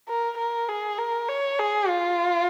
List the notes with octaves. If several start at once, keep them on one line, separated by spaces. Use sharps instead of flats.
A#4
A#4
G#4
A#4
C#5
G#4
F4